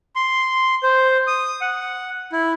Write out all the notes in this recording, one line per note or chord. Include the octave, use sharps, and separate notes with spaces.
C6
C5
D#6
F#5
E4